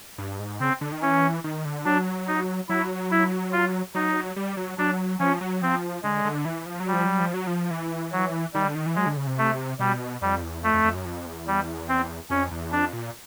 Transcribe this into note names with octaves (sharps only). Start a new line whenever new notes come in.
G2
G#2
C#3 C4
D3
D#3
E3 C#4
D#3
D3
F#3 D4
D#4
F#3 E4
E4
F4
F#3 D#4
G3
F#3
F#3 D4
F3 C#4
F#3
F3 C4
D3 G#3
D3
E3
F3
F#3
G3
F3
F#3
F3
F#3
F3
E3
F#3
D#3 G3
D3
D#3
E3
F#3 G#3
D3
C#3
C3
A3
B2 G3
F2 G3
E2
F2 A3
F2
F2
F#2
F2
E2
G3
C4
F2 C#4
E2
F2 D4
A#2